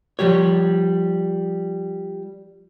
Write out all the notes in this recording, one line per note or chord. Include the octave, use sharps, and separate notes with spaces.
F3 G3 G4 C#5